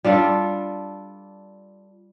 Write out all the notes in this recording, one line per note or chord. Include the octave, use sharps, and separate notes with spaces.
G3 D4 F4 A4